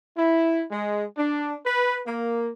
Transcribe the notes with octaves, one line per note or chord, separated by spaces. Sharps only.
E4
G#3
D4
B4
A#3